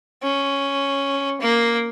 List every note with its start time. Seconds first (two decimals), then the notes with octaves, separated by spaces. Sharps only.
0.23 C#4
1.41 A#3